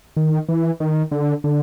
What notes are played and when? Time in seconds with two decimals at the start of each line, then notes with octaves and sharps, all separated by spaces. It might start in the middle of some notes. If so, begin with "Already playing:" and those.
0.16 D#3
0.49 E3
0.80 D#3
1.11 D3
1.44 D3